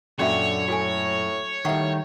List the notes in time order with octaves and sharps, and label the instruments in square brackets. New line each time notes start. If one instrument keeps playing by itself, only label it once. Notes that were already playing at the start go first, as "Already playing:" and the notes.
[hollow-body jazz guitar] F#2 A#2 [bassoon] D3 [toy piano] C#4 F#4 E5 [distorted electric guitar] C#5
[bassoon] A2 [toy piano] F#4 A4 G#5
[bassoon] A2 [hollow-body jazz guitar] D#3 G3 [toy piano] E5 F#5 C#6